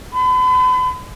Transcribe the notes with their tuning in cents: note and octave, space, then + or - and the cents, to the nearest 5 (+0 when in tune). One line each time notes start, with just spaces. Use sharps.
B5 +40